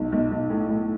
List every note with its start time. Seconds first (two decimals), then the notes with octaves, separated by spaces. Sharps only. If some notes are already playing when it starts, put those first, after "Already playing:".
Already playing: B1
0.12 B1
0.31 B1
0.50 A2
0.69 A2